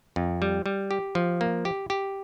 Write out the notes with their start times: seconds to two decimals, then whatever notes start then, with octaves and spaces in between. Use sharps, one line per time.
0.16 F2
0.42 G3
0.66 G3
0.91 G4
1.15 F3
1.41 A#3
1.65 G4
1.90 G4